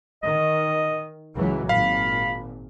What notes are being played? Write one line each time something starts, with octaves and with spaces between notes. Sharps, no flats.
D#3 D#5
C#2 E3 F#3
G#1 A#2 F5 B5